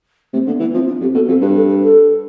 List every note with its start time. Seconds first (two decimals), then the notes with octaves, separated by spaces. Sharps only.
0.33 C3 A3
0.47 D3 B3
0.60 E3 B3
0.74 F3 C4
0.88 D4
1.01 F2 G4
1.15 B2 A4
1.28 F2 A4
1.41 G2 B4
1.56 A4
1.69 B4
1.83 A4